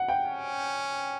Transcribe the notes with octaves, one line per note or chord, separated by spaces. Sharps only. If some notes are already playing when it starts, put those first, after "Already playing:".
Already playing: F#5
G5
C#4